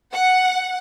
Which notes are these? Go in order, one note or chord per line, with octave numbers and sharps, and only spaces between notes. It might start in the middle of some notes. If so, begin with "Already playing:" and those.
F#5